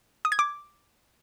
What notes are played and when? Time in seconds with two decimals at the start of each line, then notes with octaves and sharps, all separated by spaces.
0.25 D#6
0.32 G#6
0.39 D6